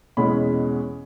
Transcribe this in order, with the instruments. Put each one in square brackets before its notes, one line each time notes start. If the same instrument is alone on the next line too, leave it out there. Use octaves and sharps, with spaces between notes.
[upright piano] E2 B2 G#3 C#4 B5